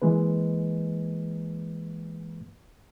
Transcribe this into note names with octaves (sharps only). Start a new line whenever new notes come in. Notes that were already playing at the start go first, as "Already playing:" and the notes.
E3 G#3 A#3 B4